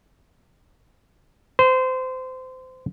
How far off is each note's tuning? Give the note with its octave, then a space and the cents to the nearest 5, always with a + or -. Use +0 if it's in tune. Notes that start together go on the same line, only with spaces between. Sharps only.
C5 -25